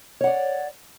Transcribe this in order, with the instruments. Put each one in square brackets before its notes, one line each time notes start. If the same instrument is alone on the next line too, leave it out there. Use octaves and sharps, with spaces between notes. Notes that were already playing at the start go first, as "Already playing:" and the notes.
[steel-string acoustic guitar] C#5
F#5
D5